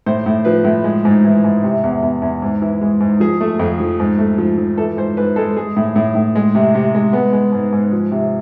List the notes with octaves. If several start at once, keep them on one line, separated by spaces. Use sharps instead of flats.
A2 C5
A2
F3 B4
A2
G#3
G#2
E3
G#2
C3
E2
E2
E2
G#2
E3
G#3
G#2
F3 G#4
A3
F2
F3
G#2
A3
F3
F3
E3 A4
G#2 C5
G#2 B4
G#3 A4
G#3 G#4
A2
A2
A2
G#3
C3
C3
G#3
G#3 B3
G#3
G#2
G#2
F3
C3